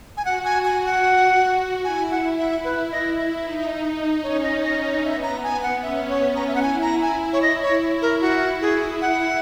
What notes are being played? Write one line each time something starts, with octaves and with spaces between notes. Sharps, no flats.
G#5
F#4 F#5
G#5
G#5
F#5
E4 G#5
F#5
E5
B4
D#5
E5
D#4
C#4 C#5
D#5
D#5
D#5
B3 E5
A#5
G#5
F#5
C#4 E5
C#5
A#5
E5
F#5
E4 G#5
A#5
G#5
C#5
D#5
C#5
A#4
F#4
G#4
F#5